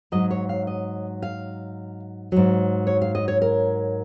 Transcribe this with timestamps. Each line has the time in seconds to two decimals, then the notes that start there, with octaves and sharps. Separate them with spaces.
0.12 G#2 F#3 D#5
0.31 C#5
0.49 F5
0.67 D#5
1.22 F5
2.32 G#2 F#3
2.87 C#5
3.02 F5
3.15 D#5
3.28 C#5
3.42 A#4